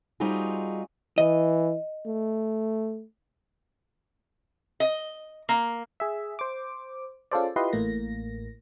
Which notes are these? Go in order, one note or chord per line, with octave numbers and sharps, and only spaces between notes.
G3 C4 D#4 F4 F#4 G#4
E3 D#5
A3
D#5
A#3
G#4 E5
C5 D6
C#4 F4 G#4 A4 C5 D5
E4 F4 G4 B4 D#5 C6
A1 A2 A#3 A#6